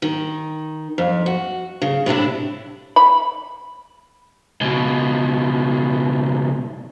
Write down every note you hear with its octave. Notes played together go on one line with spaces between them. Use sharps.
D#3
F2
F#4
C#3
A2 C3 D4 E4
B5
C#2 B2